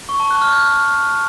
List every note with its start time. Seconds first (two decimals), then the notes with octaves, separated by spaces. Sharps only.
0.09 C#6
0.20 A5
0.31 F#6
0.41 F6
0.52 G6